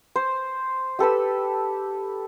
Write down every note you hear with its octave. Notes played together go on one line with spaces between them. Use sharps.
C5
G4 A4 B4 E6